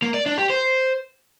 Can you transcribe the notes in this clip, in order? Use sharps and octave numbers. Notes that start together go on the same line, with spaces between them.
A#3
D5
D4
G4
C5